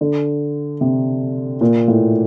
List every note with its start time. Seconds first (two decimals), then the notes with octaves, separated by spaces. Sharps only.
0.01 D3
0.81 C3
1.61 A#2
1.88 A2